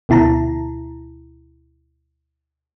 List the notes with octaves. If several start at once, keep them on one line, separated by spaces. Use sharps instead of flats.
D2 B2 E4 A5 A#5